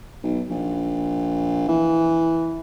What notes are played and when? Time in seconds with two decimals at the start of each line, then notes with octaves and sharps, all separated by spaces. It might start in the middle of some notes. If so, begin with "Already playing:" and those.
0.23 B1
0.50 A#1
1.68 E3